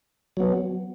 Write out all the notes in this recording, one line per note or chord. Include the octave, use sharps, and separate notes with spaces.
F#3 B3